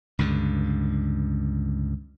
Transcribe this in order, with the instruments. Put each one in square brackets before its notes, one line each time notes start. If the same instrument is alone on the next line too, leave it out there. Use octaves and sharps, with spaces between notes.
[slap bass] C#2 G2 D3